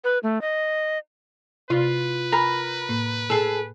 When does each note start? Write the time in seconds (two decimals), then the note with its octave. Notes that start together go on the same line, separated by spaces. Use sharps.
0.04 B4
0.23 A3
0.41 D#5
1.70 C3 F4 B4
2.32 A#4 G#5 A#5 B5
2.89 A2 A#3
3.30 G#4 A4